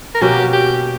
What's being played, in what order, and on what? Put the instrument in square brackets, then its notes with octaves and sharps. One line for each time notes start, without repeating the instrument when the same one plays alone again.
[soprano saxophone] A#4
[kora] B2 A#3 C#4 F#4 [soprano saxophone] G4
[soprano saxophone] G4